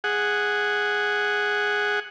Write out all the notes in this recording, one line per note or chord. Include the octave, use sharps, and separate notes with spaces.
G#4 F#5